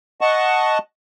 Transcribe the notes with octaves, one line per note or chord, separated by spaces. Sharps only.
D#5 F#5 A5 C#6